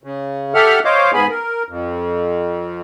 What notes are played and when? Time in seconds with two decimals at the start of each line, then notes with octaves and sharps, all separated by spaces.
0.04 C#3
0.54 G4 A4 E5 F#5 F6
0.85 C5 C#5 D#5 F5 D6
1.14 G#2 B3 G#4 G#5 B5
1.30 A#4
1.69 F2